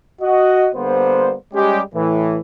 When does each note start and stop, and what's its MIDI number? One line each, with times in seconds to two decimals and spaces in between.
0.22 0.69 66
0.22 0.69 75
0.75 1.35 50
0.75 1.35 55
0.75 1.35 58
0.75 1.35 59
0.75 1.35 72
1.54 1.81 55
1.54 1.81 56
1.54 1.81 61
1.54 1.81 67
1.95 2.39 45
1.95 2.39 52